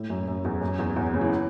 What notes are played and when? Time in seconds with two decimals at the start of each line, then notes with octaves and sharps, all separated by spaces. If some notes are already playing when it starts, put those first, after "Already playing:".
Already playing: A2
0.10 F#2
0.27 F#2
0.45 E2
0.61 F#2
0.79 E2
0.96 E2
1.14 C#3
1.21 E3